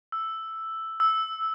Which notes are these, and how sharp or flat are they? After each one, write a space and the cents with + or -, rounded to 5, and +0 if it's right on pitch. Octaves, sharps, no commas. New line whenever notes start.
E6 +0
E6 -10